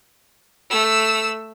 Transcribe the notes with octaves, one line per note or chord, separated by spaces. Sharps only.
A3 E6